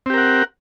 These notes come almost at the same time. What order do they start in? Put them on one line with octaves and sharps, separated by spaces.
C4 G4 A#4 F#5